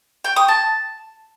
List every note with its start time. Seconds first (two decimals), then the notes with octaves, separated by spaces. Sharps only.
0.24 G5
0.36 D#6
0.48 A5